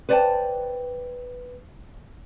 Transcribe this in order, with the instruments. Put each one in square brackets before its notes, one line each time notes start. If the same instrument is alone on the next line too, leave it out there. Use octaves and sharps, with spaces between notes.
[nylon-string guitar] B4 C5 D5 F#5 G5 A5